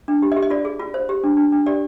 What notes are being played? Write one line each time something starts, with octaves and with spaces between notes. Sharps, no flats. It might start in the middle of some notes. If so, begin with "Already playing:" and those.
D4
G4
D#5
G4
D#5
F4 D5
G#4
F4
C5
G4
D4
D4
D4
G4 D5